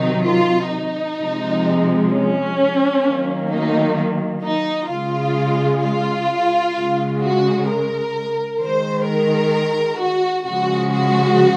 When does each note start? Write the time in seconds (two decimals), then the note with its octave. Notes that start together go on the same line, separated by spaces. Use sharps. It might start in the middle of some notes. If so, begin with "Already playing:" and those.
Already playing: C3 D#3 F#3 D#4
0.26 F4
0.72 D#4
1.19 C3 F3 G#3
2.12 C#4
3.05 D#3 F#3 A#3
3.50 D#4
4.44 D#4
4.90 C#3 G#3 F4
5.83 F4
6.76 C#3 G#3
7.22 F#4
7.69 A#4
8.61 D#3 G#3 C5
9.08 A#4
10.01 F#4
10.47 C#3 F3 G#3 F#4
10.93 F#4